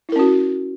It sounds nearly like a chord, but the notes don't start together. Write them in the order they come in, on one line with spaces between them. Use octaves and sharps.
E4 A#4 C#4 F#4